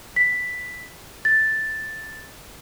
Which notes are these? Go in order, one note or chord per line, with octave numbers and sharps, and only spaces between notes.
B6
A6